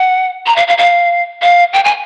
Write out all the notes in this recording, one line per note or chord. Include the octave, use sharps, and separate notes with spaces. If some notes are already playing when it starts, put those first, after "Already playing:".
Already playing: F#5
A#5
F5
F5
F5
F5
G5
G#5